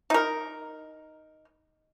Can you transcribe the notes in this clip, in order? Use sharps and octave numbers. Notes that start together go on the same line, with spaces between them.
D#4 A#4